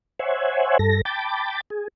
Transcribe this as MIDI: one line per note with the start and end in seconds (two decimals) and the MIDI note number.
0.19 0.78 72
0.19 0.78 73
0.19 0.78 76
0.19 0.78 78
0.19 0.78 80
0.79 1.01 43
0.79 1.01 69
0.79 1.01 94
1.05 1.61 79
1.05 1.61 81
1.05 1.61 83
1.05 1.61 86
1.05 1.61 91
1.05 1.61 93
1.70 1.88 68